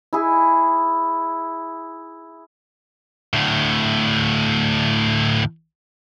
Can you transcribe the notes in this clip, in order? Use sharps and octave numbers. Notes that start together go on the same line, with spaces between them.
E4 G#4
D2 A2